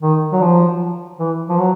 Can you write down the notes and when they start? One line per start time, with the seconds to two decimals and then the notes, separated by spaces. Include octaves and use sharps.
0.03 D#3
0.32 F#3
0.41 F3
1.19 E3
1.49 F3
1.59 F#3